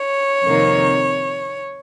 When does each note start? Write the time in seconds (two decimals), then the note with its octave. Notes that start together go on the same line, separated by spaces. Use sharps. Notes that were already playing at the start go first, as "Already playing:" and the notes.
Already playing: C#5
0.45 F2 C3 D#3 A#3